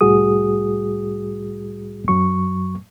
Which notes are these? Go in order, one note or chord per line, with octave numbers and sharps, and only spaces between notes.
C2 A2 G3 F#4 G#4 D#6
F#2 F#3 C#6